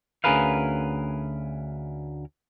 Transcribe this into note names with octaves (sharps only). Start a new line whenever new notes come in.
D2 C#4 G#4 A#4 B4 F5